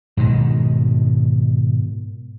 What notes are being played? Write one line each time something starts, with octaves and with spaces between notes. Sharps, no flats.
G#2 B2 D#3